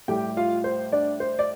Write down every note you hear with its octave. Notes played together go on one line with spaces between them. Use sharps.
A2 G3 G4 G5
F4 F5
C5
D4 D5
C5
D5